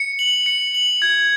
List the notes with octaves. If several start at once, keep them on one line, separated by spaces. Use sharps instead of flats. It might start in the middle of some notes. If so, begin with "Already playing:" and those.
Already playing: C#7
F#7
C#7
F#7
G#6